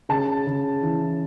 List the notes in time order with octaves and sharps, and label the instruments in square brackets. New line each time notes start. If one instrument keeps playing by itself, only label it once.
[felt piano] C#3 [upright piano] A5
[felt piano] C#3
E3